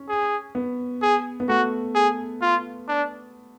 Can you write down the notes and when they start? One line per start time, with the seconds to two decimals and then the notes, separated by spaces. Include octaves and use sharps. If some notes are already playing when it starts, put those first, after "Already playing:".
Already playing: C#4
0.09 G#4
0.55 B3
1.02 G#4
1.40 B3
1.48 A3 F#4
1.95 G#4
2.42 F4
2.88 D4